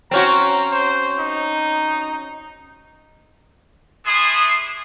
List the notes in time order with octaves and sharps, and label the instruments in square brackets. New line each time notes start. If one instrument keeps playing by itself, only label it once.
[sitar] C4 C#4 F#4 [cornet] A#5
[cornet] C5
D#4
[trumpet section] A3 D4 E4 G#4 C6 D#6